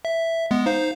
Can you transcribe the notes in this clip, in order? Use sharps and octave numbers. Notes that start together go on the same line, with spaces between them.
E5
G#3 B3
D#4 C5 F5